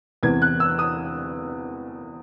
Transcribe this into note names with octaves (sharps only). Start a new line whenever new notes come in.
E2 C3 E3 G#6
F#6
E6
D#6